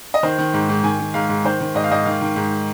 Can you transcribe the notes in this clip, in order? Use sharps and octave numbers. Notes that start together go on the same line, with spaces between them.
D#5
D#3 C5
D#3
G#2
G#2
D#3 G#5
D#3
G#2 F5
G#2
D#3 C5
D#3
G#2 D#5
F5
G#2 D#5
D#3 F5
D#3
G#2